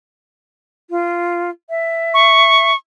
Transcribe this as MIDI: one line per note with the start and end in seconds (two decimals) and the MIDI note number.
0.90 1.50 65
1.69 2.72 76
2.14 2.76 85